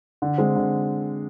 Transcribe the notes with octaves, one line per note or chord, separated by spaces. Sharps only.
D3
G#3 C4
D3